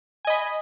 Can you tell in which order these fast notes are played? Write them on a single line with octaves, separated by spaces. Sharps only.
G#5 D#5 B5